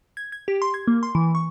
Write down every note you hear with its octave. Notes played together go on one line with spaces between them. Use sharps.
G#6
G#6
G4
C6
G#6
A#3
C6
E3
C#6